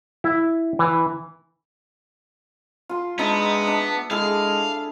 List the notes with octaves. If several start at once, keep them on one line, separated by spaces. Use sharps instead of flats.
E4
E3
F4 C6
G#3 B3 D4 D#4 E5
D4
G#3 E4 G#4 A4 F5